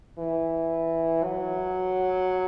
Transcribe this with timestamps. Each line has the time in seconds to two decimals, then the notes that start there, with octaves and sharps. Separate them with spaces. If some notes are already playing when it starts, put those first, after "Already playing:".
0.19 E3
1.24 F#3